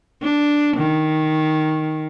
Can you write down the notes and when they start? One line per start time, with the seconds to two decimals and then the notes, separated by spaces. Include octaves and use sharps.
0.22 D4
0.77 D#3